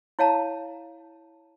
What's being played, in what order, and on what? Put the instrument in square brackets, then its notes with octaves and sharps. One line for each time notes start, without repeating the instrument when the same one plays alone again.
[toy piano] E4 C#5 F5 A5 A#5